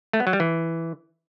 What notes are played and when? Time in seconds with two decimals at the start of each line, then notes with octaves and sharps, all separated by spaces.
0.13 A3
0.20 B3
0.27 F#3
0.33 G3
0.40 E3